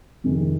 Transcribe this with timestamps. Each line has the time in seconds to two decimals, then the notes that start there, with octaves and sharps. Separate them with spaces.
0.24 F2 C3 D#3 G#3